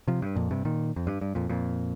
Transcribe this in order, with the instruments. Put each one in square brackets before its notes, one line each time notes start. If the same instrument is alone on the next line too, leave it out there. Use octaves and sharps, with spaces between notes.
[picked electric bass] C3 F3
G2
F2 A#2
G2 C3
A#2 D#3
F2
G2
G2
F2 A#2
F2 A#2